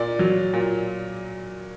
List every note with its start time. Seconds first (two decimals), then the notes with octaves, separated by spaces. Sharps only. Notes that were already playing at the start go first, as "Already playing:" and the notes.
Already playing: A#2 D5
0.19 F#3
0.54 A#2